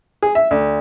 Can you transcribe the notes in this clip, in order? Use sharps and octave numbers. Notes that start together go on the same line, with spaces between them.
G#4
E5
D2